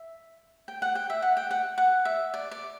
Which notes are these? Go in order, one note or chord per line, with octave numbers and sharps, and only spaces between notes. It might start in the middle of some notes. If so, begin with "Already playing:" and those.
Already playing: E5
G5
F#5
G5
E5
F#5
G5
F#5
F#5
E5
D5
D5